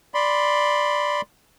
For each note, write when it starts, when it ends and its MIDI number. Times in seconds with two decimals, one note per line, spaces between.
0.14 1.21 74
0.14 1.21 83
0.14 1.21 84